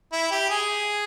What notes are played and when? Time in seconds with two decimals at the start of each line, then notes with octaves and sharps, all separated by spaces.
0.12 E4
0.31 G4
0.50 G#4